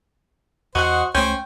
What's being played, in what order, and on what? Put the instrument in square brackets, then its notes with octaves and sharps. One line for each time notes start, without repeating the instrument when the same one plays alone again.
[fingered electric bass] E2 [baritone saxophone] F#4 [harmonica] C5 [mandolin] D#5 F#5
[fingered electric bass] C#2 A3 [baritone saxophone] C#4 [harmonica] C5 [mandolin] G5